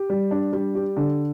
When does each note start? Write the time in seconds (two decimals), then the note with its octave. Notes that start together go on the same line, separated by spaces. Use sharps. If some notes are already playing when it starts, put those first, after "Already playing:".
Already playing: G4
0.10 G3
0.31 D4
0.53 G3
0.75 G4
0.97 D3